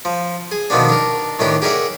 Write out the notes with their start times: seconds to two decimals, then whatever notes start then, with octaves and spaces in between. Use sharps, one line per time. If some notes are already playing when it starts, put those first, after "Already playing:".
0.05 F3
0.52 G#4
0.70 B2 D#3 F3 G3 B3 D4
0.89 D4 A#4
1.39 A2 D#3 E3 D4 G4
1.62 G4 G#4 A#4 D5 E5 F#5